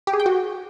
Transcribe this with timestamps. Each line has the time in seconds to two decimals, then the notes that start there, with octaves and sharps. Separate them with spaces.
0.07 G4
0.13 G#4
0.20 G5
0.26 F#4